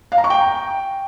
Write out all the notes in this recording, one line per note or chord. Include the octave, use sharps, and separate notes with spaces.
F5
A#5
C#6
G5